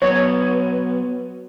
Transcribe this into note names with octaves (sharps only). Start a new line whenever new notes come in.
F#3 B3 C#5